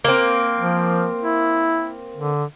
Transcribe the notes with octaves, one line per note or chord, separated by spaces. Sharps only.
A#3 C4
F3
E4
D3